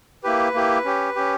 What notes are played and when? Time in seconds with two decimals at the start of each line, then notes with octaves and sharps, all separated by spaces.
0.24 A#3 E4 G4 B4
0.54 A#3 E4 G4
0.85 C#4 G4
1.16 C#4 G4